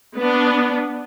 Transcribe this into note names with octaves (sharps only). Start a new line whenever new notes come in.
B3 D4